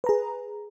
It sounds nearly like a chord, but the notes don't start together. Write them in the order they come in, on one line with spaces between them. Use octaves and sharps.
B4 A#5 G#4